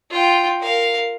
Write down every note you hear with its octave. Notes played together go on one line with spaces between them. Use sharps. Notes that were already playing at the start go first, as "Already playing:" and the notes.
F4 G5
A#4 F5